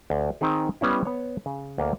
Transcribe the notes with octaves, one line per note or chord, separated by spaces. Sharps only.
D2
D#3 C4 D#4 G#4
G3 B3 C#4 E4
B3 C#5
C#3
D2 A#3 F5